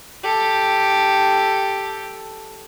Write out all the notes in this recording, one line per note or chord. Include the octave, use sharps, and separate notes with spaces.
G4 A4